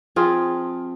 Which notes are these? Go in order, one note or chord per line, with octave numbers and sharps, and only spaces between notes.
F3 C4 F4 G#4